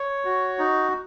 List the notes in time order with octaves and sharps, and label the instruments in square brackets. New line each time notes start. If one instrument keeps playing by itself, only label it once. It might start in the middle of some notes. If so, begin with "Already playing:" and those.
Already playing: [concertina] C#5
F#4
D#4